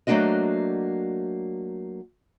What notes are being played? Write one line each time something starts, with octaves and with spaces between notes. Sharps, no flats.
F#3 A3 A#3 D4 F#4 D#5